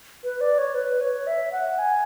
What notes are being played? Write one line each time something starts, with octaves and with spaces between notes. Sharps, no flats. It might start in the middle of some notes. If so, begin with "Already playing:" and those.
B4
D5
C#5
B4
C#5
E5
F#5
G#5